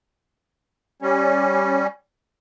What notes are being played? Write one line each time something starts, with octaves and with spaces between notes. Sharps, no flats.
G3 C#4